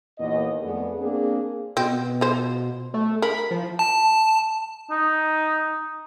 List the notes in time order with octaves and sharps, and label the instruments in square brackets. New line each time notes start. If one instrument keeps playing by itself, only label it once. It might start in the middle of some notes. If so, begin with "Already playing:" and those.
[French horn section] D#2 A#2 E3 B3 D#5
F2 A3 B3 G#4 A4 D5
A#3 C4 D4 G#4
[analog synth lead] B2 [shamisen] C4
[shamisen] F4 C5
[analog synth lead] A3
[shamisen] A#4 [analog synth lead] B5
[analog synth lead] F3
[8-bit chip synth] A5
[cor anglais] D#4